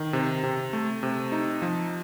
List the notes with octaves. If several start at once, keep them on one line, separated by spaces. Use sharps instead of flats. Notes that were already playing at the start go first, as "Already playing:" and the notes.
Already playing: D#3
C3
C3
A3
C3
D#4
F3